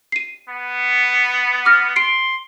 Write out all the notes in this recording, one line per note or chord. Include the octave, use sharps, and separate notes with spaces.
C7 D#7
B3
D6 F6 A#6
C6 C7 D7